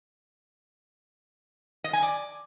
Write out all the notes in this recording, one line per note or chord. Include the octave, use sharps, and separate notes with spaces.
D#5
G#5
D5